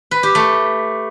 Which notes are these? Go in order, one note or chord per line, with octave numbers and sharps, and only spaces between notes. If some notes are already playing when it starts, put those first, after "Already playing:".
B4
G4
A3